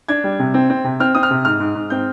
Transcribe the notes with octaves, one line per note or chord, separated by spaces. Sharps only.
D4 G#6
G3
C3
C4
C4
C3
C4 F6
C4 D#6
F6
C3
G#2 F6
G#2
G#2
C4 G6